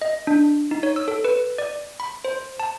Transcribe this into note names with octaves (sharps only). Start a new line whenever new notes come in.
D#5
D4
D#4
C#5
E6
A4
B4
D5
B5
C5
A5